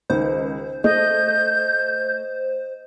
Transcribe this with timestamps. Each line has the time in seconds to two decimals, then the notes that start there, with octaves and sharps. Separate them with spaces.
0.10 C#2 D#3 C5
0.84 A3 D#5 G6